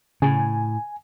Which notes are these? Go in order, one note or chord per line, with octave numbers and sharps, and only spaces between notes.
A2 C#3 G#5